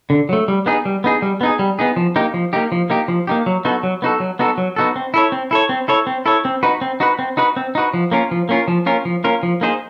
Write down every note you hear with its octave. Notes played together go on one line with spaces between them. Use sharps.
D3
F#3 A3
G3
B3 D#4 G#4
G3
B3 D#4 G#4
G3
B3 D#4 G#4
G3
B3 D#4 G#4
F3
A#3 D#4 G4
F3
A#3 D#4 G4
F3
A#3 D#4 G4
F3
A#3 D#4 G4
F#3
B3 D#4 F#4 A4
F#3
B3 D#4 F#4 A4
F#3
B3 D#4 F#4 A4
F#3
B3 D#4 F#4 A4
C4
E4 A4 C#5
C4
E4 A4 C#5
C4
E4 A4 C#5
C4
E4 A4 C#5
C4
D#4 F#4 B4
C4
D#4 F#4 B4
C4
D#4 F#4 B4
C4
D#4 F#4 B4
F3
A#3 C#4 F4 A#4
F3
A#3 C#4 F4 A#4
F3
A#3 C#4 F4 A#4
F3
A#3 C#4 F4 A#4
F3
A#3 D#4 G#4 C5